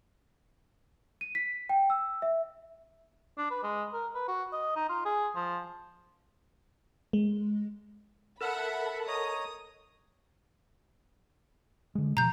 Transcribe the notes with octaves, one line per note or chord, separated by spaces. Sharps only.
D#7
B6
G5
E6
E5
D4
B4
G#3
A#4
B4
F#4
D#5
D#4
F4
G#4
F3
G#3
A4 A#4 E5 F#5 A5 B5
C#5 D#5 A#5 D#6
D3 G#3
B2 E3 F3 A#5 G6